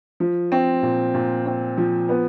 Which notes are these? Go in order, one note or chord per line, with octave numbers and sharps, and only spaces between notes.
F3
C4
A#2
A#2
C4
F3
B3